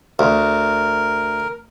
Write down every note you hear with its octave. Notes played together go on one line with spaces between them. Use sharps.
D2 A#4